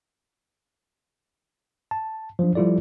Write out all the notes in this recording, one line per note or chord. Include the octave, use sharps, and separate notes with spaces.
A5
F3 F#3 D4
F3 G3 E4 F4 A4 D5